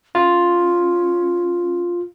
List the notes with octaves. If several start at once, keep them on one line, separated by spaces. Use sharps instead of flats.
C#4 F4